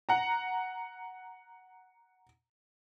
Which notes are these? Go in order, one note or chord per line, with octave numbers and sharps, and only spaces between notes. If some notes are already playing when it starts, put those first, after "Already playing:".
F#5 A#5